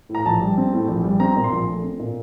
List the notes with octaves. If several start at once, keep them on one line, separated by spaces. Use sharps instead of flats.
A2
A#5
A#1 A5
G3
C4
A2
A#1
G3
C4 A#5
A#2
C6
A#1
A3
C4
A#2